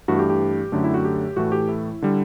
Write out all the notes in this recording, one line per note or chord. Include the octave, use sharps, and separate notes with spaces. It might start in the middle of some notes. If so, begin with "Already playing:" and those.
G2 E3 A3 F#4
G4
G4
F#2 D3 A3
E4
F#4
G4
A2 E3 A3 F#4
G4
E4
D3 G3